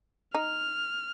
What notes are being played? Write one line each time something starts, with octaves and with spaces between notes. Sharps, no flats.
D#4 F6